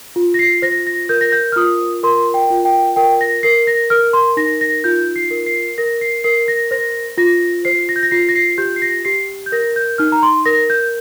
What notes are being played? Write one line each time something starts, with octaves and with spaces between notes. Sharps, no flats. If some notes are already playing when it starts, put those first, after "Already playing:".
F4
A#6
C7
C5 A#6
A#6
A#4 G6
A#6
G6
F6
F4 D#6
A#4 C6
G5
F4
G5
A#4 G5
A#6
A#4 C7
A#6
A#4 F6
C6
D#4 A#6
A#6
F4 G6
C7
A#4
C7
A#4 A#6
C7
A#4 C7
A#6
C5 A#6
F4 A#6
C5 C7
A#6
G6
A#6
F4 C7
A#6
C7
G4 G6
C7
A#6
G4 C7
G6
A#4 A#6
G6
D#4 F6
A#5
C6
A#4 A#6
G6